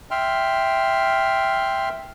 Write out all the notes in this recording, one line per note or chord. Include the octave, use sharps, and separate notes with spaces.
E5 G5 C6 F6